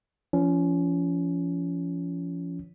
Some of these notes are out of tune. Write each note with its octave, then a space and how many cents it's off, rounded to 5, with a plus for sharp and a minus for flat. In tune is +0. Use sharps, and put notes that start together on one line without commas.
F3 -30 C#4 +25